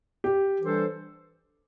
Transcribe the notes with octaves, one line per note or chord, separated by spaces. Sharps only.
G4
E3 G3 D4 A4 C5